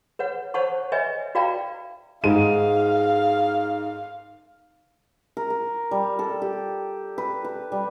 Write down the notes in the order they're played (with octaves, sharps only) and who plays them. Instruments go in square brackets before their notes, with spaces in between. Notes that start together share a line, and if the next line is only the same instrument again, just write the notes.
[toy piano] B4 C#5 F#5
C5 C#5 F#5 A5 C#6
B4 C#5 D#5 E5 G#5
F#4 B4 D5 F5 G5 A#5
[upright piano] G#2 G#3 D#7 [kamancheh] F5
[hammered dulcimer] A#4
A#4
G3
A4
G4
B4
B4
G3